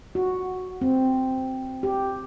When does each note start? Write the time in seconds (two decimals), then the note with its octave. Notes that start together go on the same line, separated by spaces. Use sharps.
0.15 F#4
0.81 C4
1.83 G4